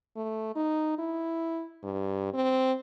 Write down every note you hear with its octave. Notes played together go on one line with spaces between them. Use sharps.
A3
D#4
E4
G2
C4